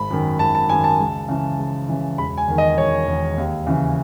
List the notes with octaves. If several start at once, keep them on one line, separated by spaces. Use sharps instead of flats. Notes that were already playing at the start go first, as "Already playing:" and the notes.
Already playing: G#1 B5
F#2 D#3
G#1 A5
A5
F#2 D#3 G#5
A5
C#2
C#3 E3
C#2
C#3 E3
E1 B5
G#5
E2 D#3
D#5
E1 C#5
E2 D#3
D#2
C#3 E3